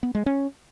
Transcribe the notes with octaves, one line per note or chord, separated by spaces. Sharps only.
B3
G#3
C#4